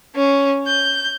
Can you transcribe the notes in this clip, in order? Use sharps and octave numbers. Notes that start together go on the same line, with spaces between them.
C#4
G6